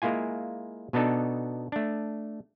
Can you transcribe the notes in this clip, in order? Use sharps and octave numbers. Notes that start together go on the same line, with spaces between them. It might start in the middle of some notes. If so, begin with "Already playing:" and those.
G#3 A#3 E4 F4 G#5
B2 B3 D4 D#4 A4
A3 D4